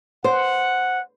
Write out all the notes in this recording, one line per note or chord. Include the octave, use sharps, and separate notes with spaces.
C5 F#5